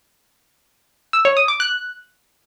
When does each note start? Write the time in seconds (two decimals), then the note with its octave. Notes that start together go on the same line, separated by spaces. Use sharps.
1.13 E6
1.25 C#5
1.37 D#6
1.48 D6
1.60 F#6